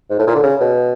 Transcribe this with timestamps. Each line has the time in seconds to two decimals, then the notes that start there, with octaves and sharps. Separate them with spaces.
0.10 G#2
0.19 A2
0.27 A#2
0.35 D3
0.43 C#3
0.60 B2